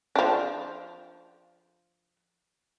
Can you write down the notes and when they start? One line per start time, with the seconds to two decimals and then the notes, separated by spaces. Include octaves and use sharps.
0.16 F3 D4